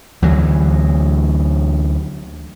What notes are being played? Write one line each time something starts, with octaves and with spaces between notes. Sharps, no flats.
D2 E3 F#3